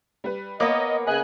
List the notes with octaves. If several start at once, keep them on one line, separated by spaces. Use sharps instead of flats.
G3 B4
A#3 B3 A#4 C#5 D#5 D6
C#3 B4 D#5 G#5 F#6